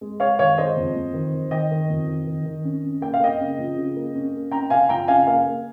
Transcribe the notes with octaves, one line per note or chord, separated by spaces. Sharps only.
G#3
G#3 C#5 F5
D#3 C#5 F5
G#3 C5 D#5
F2
F2
D#3
D#3
D#3 D#5 G5
D#3
F2
D#3
D#3
D#3
C#4
C#4
A#3 G5
F5
A#3 D#5 G5
C#3
F3
C#3
A#3
C#4
A#3
C#4 G5 A#5
C#3 F5 G#5
F3 G5 A#5
C#3 F5 G#5
A#3 F5 G#5
A#3